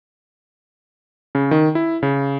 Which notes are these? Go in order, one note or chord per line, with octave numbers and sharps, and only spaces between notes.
C#3
D#3
E4
C#3